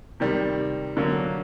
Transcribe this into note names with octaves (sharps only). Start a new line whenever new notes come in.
C3 D#3 G3
D3 F#3 A#3